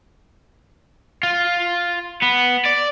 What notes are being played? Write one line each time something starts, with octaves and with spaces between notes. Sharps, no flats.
F4
B3
D5